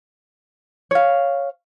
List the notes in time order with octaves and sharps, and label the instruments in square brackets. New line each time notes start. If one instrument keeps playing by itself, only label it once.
[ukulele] C#5 F5